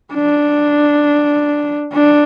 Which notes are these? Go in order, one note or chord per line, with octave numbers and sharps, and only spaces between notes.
D4
D4